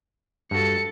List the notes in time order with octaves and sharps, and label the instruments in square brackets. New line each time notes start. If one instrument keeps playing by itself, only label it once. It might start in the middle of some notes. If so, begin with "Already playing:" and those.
[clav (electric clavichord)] G2 F#4 [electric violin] A4 C#7